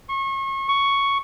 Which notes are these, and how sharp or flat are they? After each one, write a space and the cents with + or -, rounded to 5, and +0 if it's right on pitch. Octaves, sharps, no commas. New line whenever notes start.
C#6 -35
C#6 +5